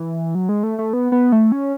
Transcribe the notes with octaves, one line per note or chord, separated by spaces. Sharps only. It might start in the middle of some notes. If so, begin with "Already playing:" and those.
Already playing: E3
F#3
G#3
A3
A3
B3
B3
A3
C#4